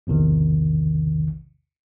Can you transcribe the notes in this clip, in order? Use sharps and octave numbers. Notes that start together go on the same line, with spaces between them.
A#1 E2 C3 D#3